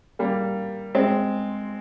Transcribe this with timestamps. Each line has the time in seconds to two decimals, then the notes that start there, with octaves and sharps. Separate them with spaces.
0.19 G3 A#3
0.95 G#3 C4